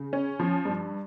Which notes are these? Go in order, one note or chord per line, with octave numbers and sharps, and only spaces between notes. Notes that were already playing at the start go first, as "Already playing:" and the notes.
Already playing: C#3
C#4
F3
G2